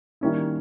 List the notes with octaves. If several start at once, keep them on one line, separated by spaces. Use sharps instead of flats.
D#3 G3 A#3 C#4 E4